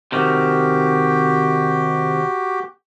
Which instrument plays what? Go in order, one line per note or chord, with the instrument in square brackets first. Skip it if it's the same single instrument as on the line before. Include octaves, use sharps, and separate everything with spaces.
[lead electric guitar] C3 D#3 [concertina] F#4 G4 G5